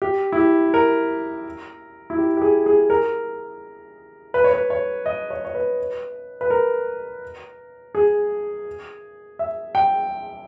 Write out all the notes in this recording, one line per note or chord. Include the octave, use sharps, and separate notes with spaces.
G4
E4
G4
A#4
E4
G4
G4
G#4
G#4
A#4
B4
C#5
B4
C#5
D#5
C#5
C#5
B4
B4
A#4
G#4
E5
G5